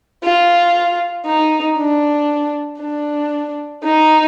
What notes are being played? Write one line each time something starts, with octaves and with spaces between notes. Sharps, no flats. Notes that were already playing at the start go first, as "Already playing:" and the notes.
F4
D#4
D4
D4
D#4